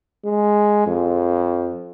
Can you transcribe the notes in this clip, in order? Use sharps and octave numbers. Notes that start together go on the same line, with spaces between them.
G#3
F2